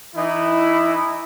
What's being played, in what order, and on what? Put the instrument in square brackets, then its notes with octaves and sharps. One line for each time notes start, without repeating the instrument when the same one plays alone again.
[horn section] E3 D#4 E4